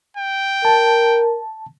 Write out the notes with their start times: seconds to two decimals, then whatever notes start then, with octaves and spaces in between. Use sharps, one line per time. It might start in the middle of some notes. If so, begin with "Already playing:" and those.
0.17 G5
0.65 A#4 A5